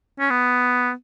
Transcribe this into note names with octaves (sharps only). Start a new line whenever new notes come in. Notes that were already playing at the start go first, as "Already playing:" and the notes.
C#4
B3